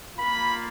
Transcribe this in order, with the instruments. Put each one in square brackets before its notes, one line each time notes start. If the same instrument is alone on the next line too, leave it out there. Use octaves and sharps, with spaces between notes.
[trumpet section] A#3 F4 B5